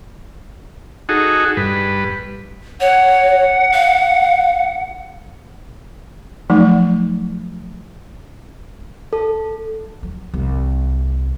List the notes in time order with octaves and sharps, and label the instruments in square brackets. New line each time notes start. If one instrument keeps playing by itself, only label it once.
[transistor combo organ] D#4 F#4 G#4 A4
G2 B4
[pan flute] C#5 [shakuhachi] F#5
[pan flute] F5
[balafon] F3 F#3 A3 D#4
[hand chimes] A4
[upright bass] F#3
C2